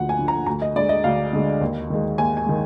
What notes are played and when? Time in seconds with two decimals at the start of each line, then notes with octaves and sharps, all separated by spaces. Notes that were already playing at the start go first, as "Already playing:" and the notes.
Already playing: D2 D3 F3 F#5
0.09 G#5
0.19 D3 F3
0.28 A#5
0.46 D2 A#5
0.62 D#5
0.76 D3 D5
0.79 G#3
0.89 D#5
1.04 D2 F5
1.33 D3 G#3
1.61 D#2
1.90 D#3 G#3
2.18 D#2 G#5
2.37 G#5
2.46 D#3 G#3